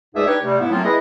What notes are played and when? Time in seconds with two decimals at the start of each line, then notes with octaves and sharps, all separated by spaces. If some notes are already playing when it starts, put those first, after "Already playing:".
0.15 C#2 G#2 A3 G#4 D5 E5
0.26 D4 D#4 G4 B4 C#5
0.43 C3 G3 A3
0.58 G#2 B3 E4
0.70 F#3 A3 A#3 C4 C#4 F4
0.84 E4 G#4 B4 D#5